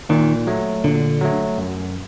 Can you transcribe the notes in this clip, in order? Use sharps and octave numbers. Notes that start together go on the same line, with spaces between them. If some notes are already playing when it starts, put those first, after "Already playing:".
A#2 D#3
F#3 A3
A#2 D3
F#3 A3
F#2